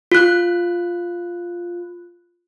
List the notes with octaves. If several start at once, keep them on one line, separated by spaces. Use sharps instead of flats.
F4 F#6